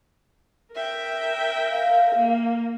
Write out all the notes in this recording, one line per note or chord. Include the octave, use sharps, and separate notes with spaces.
A#4 E5 G5
F5
A#3